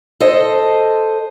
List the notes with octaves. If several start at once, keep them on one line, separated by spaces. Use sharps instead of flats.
A4 C5 D#5